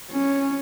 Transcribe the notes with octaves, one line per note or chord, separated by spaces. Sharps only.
C#4